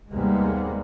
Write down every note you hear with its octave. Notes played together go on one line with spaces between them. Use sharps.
D#2 C3 G3 G#3 A#3 B3